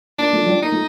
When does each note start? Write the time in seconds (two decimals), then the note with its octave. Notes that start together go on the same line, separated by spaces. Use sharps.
0.18 A#3 D4
0.33 A3
0.42 F3
0.47 G3
0.62 A#3 D#4
0.72 A3